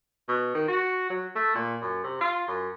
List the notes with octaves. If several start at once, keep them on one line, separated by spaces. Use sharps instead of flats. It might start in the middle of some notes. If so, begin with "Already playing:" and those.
B2
D#3
F#4
F#3
A3
A#2
F#2
C3
F4
F#2